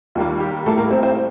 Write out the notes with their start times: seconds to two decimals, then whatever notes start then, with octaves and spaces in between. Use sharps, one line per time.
0.15 D#2 D#3 G3 A#3 F4
0.40 G4
0.66 A2 G3 A3 A#3 A4
0.77 A#3 A#4
0.91 C4 C5
1.03 C4 C5